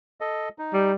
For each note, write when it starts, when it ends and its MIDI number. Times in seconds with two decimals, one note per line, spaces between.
0.21 0.49 69
0.21 0.49 75
0.59 0.92 63
0.73 0.95 55